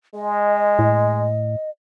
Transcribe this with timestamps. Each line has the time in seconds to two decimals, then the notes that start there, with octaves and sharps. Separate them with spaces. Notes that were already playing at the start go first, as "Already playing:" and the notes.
0.15 G#3 D#5
0.79 A2